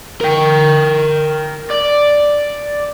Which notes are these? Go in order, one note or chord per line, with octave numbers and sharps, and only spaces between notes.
A#4 G5
D5